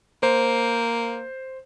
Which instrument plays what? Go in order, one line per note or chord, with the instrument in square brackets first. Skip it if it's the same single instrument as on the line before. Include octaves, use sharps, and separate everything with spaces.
[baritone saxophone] A#3 [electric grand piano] C5